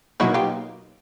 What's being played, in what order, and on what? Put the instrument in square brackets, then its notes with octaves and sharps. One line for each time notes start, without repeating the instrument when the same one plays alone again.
[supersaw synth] B2 F#3 A#3 D#4 [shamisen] E4 F#4
[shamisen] F4 G4